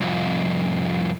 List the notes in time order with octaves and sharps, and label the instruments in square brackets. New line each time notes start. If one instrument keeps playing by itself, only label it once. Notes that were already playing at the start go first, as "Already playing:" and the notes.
[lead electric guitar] C2 F2